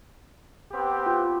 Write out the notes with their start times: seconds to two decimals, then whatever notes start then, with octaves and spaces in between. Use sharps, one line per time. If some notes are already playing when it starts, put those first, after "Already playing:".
0.72 B3 C4 G4
1.06 F4